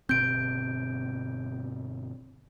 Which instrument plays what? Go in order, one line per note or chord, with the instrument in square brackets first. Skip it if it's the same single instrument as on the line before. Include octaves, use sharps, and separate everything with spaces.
[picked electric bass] G1 B2 C4 [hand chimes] G6 D7